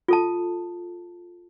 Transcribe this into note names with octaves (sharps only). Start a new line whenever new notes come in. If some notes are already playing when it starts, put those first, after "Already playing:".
F4 A4 A5